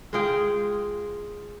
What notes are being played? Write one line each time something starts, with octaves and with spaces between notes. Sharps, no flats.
G#3 F4 G#4 G5